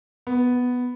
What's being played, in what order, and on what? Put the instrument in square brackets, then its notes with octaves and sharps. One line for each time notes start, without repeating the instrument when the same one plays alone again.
[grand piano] B3